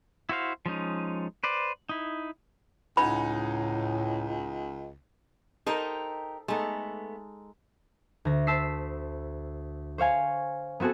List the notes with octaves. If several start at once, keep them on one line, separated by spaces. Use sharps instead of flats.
E4 F#4 C5 F5
F3 G#3 C#4 D#4
B4 C5 D5
D#4 E4
C#2 A2 D#4 F#5 G#5 B5
D#4 G4 A4 A#4 C5 D#5
G#3 A3 B3 D#4 A4
D2 A#6
C5 A5 E6 B6 C7
C5 C#5 F5 G#5
B3 C4 F#4 G#4 A4